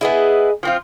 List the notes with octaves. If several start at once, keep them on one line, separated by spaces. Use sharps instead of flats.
B3 E4 G#4 D#5
F3 C4 F4